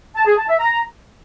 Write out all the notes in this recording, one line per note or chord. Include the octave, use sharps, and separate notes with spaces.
A5
G#4
A5
E5
A#5